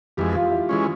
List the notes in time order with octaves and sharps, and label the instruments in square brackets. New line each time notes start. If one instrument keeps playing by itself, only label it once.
[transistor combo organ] F2 E3 G#3 [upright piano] G4
[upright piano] F4
E4
[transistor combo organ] E3 G#3 C#4